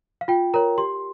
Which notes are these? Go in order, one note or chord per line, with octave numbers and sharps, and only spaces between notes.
F5
F4 G5
A#4 C#5 A#5
G4 C6